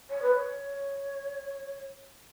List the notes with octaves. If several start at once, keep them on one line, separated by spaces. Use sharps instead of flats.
C#5
B4
C#5